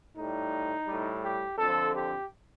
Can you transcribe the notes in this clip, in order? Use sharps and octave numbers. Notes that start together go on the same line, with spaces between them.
A2 G3 D#4
A2 G3
G4
F2 D3 F3 A4
G4